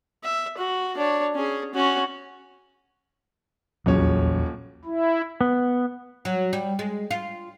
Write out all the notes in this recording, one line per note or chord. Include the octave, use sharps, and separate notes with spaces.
E5
F#4
D4 C#5
C#4 G#4
C#4 F#4
D#1 A#1 E2 C#3 F#3 C#5
E4
B3
F#3
G3
G#3
F4